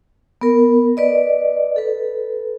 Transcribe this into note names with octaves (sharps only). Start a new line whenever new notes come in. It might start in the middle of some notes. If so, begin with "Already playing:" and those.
B3 A#4
B4 D5 D#5
A4 B4